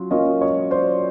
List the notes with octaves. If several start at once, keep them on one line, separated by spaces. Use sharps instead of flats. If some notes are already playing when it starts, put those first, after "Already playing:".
Already playing: F#3 C#4 F4
F#3 A#3 C#4 F4 D#5 F5
C#5 D#5
C5 D5